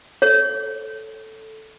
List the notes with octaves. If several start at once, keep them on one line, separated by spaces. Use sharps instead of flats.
A4 C#5